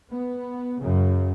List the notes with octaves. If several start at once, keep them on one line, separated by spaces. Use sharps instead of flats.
B3
F#2 C#3